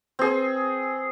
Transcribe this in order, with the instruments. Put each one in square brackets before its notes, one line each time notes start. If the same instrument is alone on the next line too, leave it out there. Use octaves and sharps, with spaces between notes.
[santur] C4 G#4